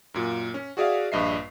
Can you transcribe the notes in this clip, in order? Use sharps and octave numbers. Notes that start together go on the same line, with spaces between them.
F#2 A#2
C#4
F#4 G#4 D5 E5 F5
A#1 G2 D#5 E5 C7